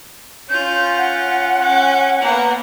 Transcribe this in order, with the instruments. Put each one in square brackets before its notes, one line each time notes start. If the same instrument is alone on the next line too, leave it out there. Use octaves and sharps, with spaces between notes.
[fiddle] C#4 F4 [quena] G6
[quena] F#5
[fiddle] C#4
A#3 B3